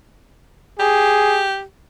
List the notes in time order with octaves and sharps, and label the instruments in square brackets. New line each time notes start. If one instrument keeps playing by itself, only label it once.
[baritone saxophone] G4 [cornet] G#4